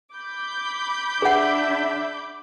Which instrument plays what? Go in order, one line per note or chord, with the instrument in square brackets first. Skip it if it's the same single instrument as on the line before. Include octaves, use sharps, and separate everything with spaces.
[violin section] B5 D6 G6
[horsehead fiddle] D4 E5 [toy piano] G#4 F#5